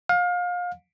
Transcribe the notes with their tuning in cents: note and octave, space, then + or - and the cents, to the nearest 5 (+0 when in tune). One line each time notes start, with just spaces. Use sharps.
F5 +30